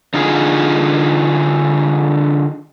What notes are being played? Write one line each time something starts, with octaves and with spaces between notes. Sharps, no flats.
D3 D#4 F4 G#4